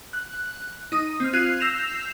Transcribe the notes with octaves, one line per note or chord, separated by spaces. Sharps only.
F#6
D#4 D#6 D#7
C4 F6
F4 F#6 G#6 C7 D#7
E6 G6 A#6 C7 E7 F7